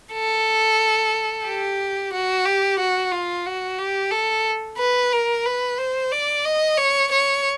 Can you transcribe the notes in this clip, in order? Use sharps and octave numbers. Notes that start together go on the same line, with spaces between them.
A4
G4
F#4
G4
F#4
F4
F#4
G4
A4
B4
A#4
B4
C5
D5
D#5
C#5
C#5